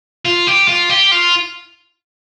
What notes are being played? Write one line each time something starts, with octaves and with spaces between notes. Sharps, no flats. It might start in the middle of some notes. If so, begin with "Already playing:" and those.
F4
G4
F4
G4
F4